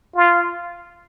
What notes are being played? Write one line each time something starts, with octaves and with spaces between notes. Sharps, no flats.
F4